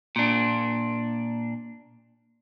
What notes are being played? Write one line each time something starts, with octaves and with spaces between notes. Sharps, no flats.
A#2 D4